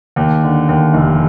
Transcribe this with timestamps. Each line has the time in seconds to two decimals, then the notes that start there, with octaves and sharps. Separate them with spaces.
0.16 D#2
0.43 D3
0.69 D#2
0.94 F1